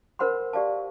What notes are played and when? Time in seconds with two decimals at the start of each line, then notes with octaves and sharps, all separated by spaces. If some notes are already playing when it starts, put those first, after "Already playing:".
0.19 D#4 A#4 C5 F#5 B5 C6
0.53 G4 D5 F5 A5